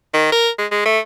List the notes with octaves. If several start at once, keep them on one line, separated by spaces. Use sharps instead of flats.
D#3
A#4
G#3
G#3
A3